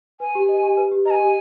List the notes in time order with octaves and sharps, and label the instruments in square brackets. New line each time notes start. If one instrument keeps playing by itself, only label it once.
[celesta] B4 [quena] G#5
[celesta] G4
D#5
G4
B4
G4
[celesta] D#5 [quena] A#5
[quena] G#5
[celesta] G4